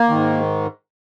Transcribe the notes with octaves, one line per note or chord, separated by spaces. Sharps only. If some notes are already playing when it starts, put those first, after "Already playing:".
Already playing: A#3
G#2 D#3